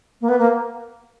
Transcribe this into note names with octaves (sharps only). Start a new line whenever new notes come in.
A#3
B3
A#3